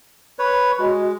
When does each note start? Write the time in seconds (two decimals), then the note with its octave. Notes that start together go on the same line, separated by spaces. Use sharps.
0.39 B4 C#5
0.79 G#3 F#4 D#5